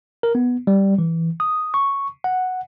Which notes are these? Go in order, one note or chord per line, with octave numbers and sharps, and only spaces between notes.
A#4
B3
G3
E3
D#6
C#6
F#5